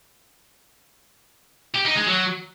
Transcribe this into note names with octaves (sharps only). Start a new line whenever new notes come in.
G4
D#4
G#3
F#3